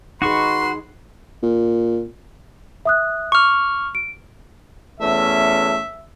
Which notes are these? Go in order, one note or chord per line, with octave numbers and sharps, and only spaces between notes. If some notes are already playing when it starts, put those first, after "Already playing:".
D#4 F#4 G#4 B4 C6 C#6
A#2
E5 D#6 F#6
C#6 D6 F6
D7
E2 A3 C#4 E5